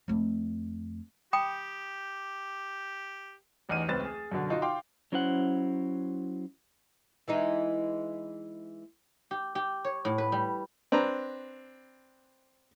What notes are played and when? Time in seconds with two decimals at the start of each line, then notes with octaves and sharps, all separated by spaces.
0.08 F2 A3
1.33 G4 G5 B5 D#6
3.69 A1 E2 D#4 F6 D#7
3.88 D1 C#2 C4 B4 A6 E7
4.04 G#4
4.32 F#2 B2 D3
4.50 D#4 F4 F#4
4.62 F5 G5 C6 D6
5.12 F#3 C#4 E4 C5 F5 F#5
7.28 E3 G#3 D#4
9.31 G4
9.55 G4
9.84 C#5
10.05 A2
10.18 B4
10.32 G3
10.92 C4 D4 B4 A#5